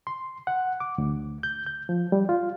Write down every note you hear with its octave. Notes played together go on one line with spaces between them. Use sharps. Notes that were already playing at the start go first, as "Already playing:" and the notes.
C6
F#5
D6
D2
G6
G6
F3
G3
F4